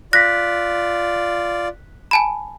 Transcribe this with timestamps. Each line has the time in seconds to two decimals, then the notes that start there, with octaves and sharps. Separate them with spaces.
0.13 F4 D5 F#6 A#6 B6
2.11 G#5 A5 B5